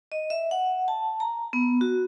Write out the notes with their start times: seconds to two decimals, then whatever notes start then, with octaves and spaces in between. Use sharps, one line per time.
0.12 D#5
0.30 E5
0.51 F#5
0.88 A5
1.20 A#5
1.53 B3
1.81 F#4